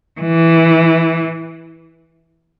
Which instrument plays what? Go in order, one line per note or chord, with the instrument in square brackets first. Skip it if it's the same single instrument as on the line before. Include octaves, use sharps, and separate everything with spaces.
[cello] E3